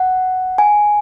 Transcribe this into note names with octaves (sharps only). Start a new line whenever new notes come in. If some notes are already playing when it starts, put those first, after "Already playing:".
Already playing: F#5
G#5